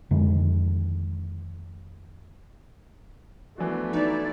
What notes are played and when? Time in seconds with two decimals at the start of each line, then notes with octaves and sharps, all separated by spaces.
0.11 F2 D3 D#3 G#3
3.58 E3 F3 A3 B3 D4 F#4
3.93 D#4 E4 D5